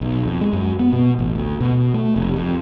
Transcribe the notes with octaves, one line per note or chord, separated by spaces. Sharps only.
B1
F2
G#3
F#2
B3
B2
A1
D2
B2
A3
F1
F2